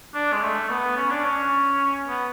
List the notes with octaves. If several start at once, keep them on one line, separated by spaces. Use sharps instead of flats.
D4
G#3
A3
B3
C#4
D4
C#4
B3